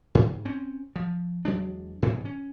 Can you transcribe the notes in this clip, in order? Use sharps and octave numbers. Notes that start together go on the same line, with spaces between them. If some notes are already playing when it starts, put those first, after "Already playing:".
G#2
C4 C#4
F3
E2 F#3 G#3 D4
G#2 B2 E3 G3
C#4